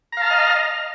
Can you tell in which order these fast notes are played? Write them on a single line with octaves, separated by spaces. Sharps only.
A#5 F5 A5 F6 D#5